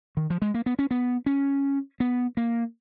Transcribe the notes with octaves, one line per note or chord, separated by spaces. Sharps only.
D#3
F3
G#3
A#3
B3
C#4
B3
C#4
B3
A#3